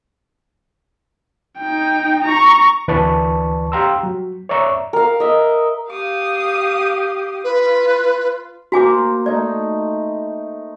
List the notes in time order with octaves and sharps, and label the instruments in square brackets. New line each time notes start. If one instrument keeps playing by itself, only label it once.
[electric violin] D#4 G5
A#5 C#6
[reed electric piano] D2 E3 B4 D5 A5 C#6
G4 F5 G5 A#5 C6 E6
F#3
C#5 D5 E5 A#5 C#6
[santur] A#4 F5
D#5 E5
[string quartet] G4 F5 D#6
[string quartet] F4 [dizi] B4
[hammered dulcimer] A#3 C5 A#5 [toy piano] F#4 G#5 D6
[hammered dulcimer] A3 D#4 [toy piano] D5